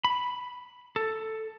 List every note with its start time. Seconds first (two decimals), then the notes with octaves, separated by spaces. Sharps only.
0.05 B5
0.96 A4